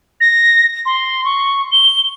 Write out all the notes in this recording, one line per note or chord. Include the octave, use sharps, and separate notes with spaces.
A#6
C6
C#6
G7